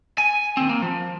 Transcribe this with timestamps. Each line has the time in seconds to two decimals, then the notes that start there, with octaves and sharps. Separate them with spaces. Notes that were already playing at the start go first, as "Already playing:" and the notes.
0.18 G#5
0.57 D#2 C4
0.69 A#3
0.82 F3